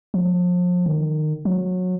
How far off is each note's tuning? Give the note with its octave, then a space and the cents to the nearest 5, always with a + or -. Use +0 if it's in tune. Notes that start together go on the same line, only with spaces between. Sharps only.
F3 +35
D#3 -25
F#3 -20